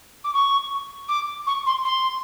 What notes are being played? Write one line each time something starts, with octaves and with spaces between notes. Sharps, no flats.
D6
C#6
D6
C#6
C6
C6